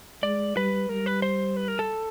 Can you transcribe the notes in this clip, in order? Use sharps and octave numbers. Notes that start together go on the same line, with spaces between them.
G#3 D5
G3 B4
G3 A#4
B4
C5
B4
A#4
A4